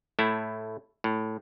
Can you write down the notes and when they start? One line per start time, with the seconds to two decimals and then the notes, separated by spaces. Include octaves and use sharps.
0.19 A2 A3 E4
1.04 A2